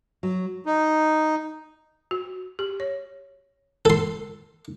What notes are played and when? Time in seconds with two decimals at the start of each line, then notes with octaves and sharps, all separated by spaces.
0.23 F#3
0.66 D#4
2.11 F#4
2.59 G4
2.80 C#5
3.85 A4 C6